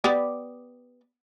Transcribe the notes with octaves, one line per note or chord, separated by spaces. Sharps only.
B3 G4 D5